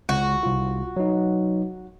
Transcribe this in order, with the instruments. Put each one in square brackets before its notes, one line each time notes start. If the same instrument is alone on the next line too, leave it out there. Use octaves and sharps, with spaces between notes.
[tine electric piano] C#2 [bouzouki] F#4
[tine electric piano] C2 F4
F#3 D#4